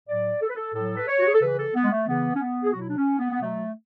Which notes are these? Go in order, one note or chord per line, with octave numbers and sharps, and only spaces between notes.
A2 F#3 D5
A4
B4
A4
A2 F#3 A4
B4
C#5
F#4
G#4
A4
C#3 E3 B4
A4
B3
G#3
A3
C#3 E3 B3
C#4
B3
G#4
B2 F#3 F#4
E4
D4
C#4
B3
B3
B2 F#3 A3